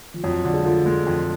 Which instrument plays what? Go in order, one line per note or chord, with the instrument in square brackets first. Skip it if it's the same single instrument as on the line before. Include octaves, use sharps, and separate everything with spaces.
[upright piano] F3
[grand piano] F2 [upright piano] F#3
[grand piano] D3
[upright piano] G#3
[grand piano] F3 [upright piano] A3
[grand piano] G#3
F2